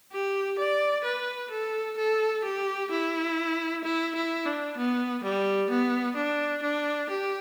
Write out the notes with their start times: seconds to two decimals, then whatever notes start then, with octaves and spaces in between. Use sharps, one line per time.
0.12 G4
0.58 D5
1.04 B4
1.51 A4
1.98 A4
2.44 G4
2.91 E4
3.84 E4
4.15 E4
4.46 D4
4.77 B3
5.23 G3
5.69 B3
6.17 D4
6.63 D4
7.10 G4